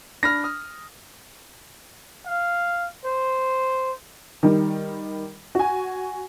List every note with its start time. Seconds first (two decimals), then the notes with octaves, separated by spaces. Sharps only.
0.23 D4 B5 F6 A#6
0.44 D#6 F6
2.26 F5
3.05 C5
4.43 D#3 G3
5.55 F#4 G#5